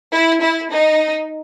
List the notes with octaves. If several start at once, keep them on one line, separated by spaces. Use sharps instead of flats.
E4
E4
D#4